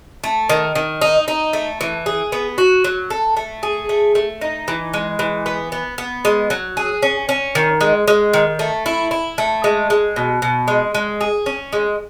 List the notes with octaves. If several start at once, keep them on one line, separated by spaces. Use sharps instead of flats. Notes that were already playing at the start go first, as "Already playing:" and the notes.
A3
D#3
D#3
D#4
D#4
A3
E3
G#4
B3
F#4
F#3
A4
A3
G#4
A3
A3
D#4
E3
G#3
E3
B3
B3
B3
G#3
F#3
G#4
C#4
C#4
D#3
G#3
G#3
D#3
A3
E4
E4
A3
G#3
G#3
B2
B2
G#3
G#3
G#4
C#4
G#3